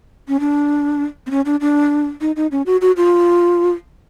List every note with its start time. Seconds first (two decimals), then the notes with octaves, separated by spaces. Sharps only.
0.28 C#4
0.40 D4
1.27 C4
1.31 C#4
1.46 D4
1.61 D4
2.21 D#4
2.36 D#4
2.52 C#4
2.66 F#4
2.81 F#4
2.97 F4